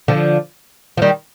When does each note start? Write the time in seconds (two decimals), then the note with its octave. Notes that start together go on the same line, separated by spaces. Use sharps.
0.08 D3 F3
0.97 F3
1.02 D#3 G3